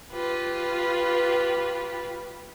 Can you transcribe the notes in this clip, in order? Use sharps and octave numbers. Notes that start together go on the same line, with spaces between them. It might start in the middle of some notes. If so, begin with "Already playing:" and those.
F4 G4 B4